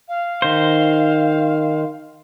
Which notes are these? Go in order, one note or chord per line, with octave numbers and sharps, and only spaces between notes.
F5
D#3 C5